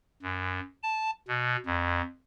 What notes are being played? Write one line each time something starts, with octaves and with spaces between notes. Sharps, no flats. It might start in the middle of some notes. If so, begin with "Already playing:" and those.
F#2
A5
B2
F2